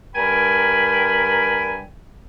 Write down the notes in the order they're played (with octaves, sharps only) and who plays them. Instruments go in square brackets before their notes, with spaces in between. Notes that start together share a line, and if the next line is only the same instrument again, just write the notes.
[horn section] G2 A#4 G5 G#5 B5